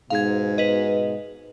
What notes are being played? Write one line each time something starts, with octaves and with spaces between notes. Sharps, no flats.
G#2 B2 F5 G#6
B4 D#5